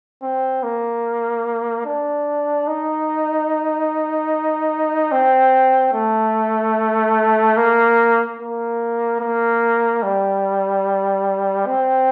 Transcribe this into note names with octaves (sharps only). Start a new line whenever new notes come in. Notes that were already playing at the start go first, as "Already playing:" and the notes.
C4
A#3
D4
D#4
C4
A3
A#3
A#3
A#3
G3
C4